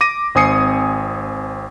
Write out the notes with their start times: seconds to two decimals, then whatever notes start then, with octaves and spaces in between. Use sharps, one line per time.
0.01 D6 A#6 D#7
0.35 G#1 C4 G#5 D#6 C7 C#7